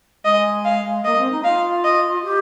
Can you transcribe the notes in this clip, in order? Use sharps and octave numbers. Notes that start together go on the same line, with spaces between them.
G#3 D#5
F5
A#3 D#5
C4
D#4
F4 F5
D#5
G4